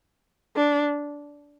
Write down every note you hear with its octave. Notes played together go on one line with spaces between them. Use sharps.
D4